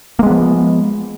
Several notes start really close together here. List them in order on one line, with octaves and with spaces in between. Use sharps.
A#3 G#3 B3 F3